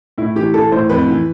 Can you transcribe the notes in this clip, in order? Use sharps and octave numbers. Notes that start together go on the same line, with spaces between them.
A2 E4
E3 G4
E3 A4
A2 C5
F2 B4
E3